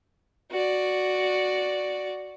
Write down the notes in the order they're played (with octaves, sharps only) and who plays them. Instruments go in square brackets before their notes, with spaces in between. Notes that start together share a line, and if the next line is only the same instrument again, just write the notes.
[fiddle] F#4 D5